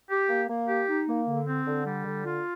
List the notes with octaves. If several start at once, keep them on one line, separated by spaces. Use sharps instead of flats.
G4
A#3
A#3
G4
D#4
A#3
D3
C4
D3
G3
D3
F4